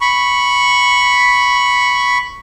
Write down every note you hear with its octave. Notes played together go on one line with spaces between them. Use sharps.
B5 C#6